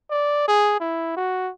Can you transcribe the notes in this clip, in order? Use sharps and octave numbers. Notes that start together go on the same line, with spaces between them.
D5
G#4
E4
F#4